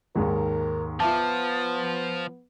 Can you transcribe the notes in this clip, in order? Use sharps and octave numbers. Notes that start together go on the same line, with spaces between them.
D#2 G#2 D#3 A#4
F3 B3 F4 E5 A5 D6